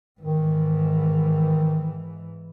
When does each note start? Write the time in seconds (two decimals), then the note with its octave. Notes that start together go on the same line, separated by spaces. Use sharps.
0.21 G#2 D#3 E3